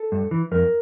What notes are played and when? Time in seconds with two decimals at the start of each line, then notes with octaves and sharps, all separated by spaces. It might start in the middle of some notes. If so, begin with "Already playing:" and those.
Already playing: A4
0.12 G2
0.31 E3
0.51 F2 A#4